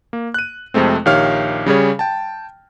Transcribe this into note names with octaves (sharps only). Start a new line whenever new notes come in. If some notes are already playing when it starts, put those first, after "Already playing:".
A#3
F#6 D#7
F2 C3 G#3 A3 C4
A#1 D#3 G4 C#5 F5 F6
C#3 G3 G#4 C#5
G5 A5